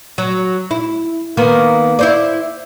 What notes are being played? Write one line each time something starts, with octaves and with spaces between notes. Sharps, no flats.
F#3
E4
D#3 A#3 B3
E4 C5 D5